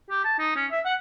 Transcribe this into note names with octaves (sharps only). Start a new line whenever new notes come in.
G4
A5
D#4
C#4
E5
F#5